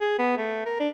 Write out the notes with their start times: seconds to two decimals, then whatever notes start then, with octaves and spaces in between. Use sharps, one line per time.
0.01 G#4
0.19 B3
0.38 A3
0.66 A#4
0.80 D4